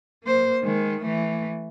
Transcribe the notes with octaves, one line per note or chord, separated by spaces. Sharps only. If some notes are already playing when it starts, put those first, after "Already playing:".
A#3 C5
D#3 G#3
E3 A3